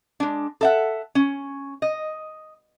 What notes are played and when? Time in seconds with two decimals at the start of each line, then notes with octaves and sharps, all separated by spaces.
0.20 G#3 D4
0.61 A4 E5 F#5
1.15 C#4
1.82 D#5